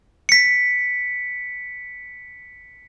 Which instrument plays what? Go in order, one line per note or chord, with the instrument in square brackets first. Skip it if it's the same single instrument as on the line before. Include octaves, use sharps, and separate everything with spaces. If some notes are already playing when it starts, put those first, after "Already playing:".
[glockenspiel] B6 C#7